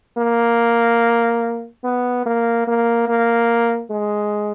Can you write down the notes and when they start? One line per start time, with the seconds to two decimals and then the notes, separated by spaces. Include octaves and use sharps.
0.18 A#3
1.84 B3
2.26 A#3
2.67 A#3
3.08 A#3
3.91 G#3